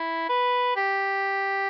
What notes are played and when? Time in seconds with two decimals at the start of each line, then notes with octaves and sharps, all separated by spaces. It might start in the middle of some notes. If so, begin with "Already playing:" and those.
Already playing: E4
0.29 B4
0.76 G4